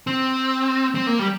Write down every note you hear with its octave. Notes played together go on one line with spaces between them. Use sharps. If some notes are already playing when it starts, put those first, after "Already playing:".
C4
C4
A#3
G3